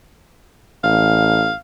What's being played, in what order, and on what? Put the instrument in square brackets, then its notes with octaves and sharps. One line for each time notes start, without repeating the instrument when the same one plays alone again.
[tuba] A1 [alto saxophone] F5